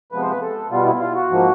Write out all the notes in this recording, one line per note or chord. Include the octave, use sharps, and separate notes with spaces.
C3 F3 G#3 B3 B4
C5
B4
A4
B2 G3 B3 F4
E4
F4
F#4
G#2 F3 A#3